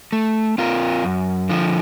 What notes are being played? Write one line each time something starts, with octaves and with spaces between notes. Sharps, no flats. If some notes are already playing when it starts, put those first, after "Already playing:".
A3
C4 F4 A#4
F#2
D3 F3